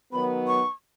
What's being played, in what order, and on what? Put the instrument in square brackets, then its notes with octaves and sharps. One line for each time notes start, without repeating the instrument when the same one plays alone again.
[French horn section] D#3 F#3 B3 [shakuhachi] B5
[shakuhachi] C#6